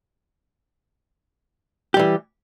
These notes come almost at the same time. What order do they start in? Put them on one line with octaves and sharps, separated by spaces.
G4 G3 E3